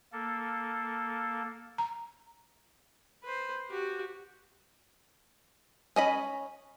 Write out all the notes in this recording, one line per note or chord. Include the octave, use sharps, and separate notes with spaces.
A#3 A4
A#5
B4 C5
F#4 G4
C#4 D#5 B5